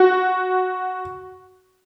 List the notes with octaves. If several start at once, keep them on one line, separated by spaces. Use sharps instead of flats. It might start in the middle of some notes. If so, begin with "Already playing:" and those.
Already playing: F#4